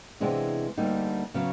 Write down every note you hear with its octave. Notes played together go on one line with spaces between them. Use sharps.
C3 E3 G#3 B3 D4
D2 D3 G3 A#3 D#4
C#3 F#3 B3